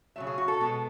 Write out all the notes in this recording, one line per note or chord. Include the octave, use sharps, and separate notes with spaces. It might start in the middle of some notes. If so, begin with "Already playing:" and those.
C#3 F#3 A3 E5
G#4
F#4
A4
B2 G#3 B3